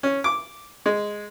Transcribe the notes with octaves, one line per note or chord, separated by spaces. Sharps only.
C#4
D6
G#3